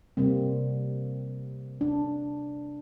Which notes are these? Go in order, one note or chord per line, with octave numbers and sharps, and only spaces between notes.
C3 G3 A#3 C4
D4